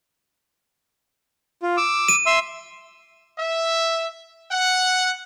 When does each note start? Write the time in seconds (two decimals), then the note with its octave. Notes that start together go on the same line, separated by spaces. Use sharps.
1.62 F4
1.77 D6 E6
2.09 D#7
2.26 E5 C6 E6
3.38 E5
4.51 F#5